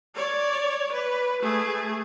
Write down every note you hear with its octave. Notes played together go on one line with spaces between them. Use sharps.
C#5 D5
B4
A3 G#4